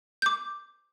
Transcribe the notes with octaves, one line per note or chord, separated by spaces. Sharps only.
D6 G6